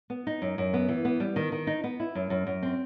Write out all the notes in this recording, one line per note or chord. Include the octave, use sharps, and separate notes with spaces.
B3
D#4
F#2
F#2
B3
E3
B3
G3
D#3
D#3
D#4
B3
E4
F#2
F#2
F#2
C4